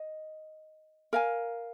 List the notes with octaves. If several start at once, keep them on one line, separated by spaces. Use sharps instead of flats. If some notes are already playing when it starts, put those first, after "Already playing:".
Already playing: D#5
A#4 F5 G#5